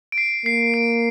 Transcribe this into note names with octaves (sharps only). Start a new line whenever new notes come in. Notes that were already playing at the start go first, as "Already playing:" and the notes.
D7
C7
A#3 C7
D7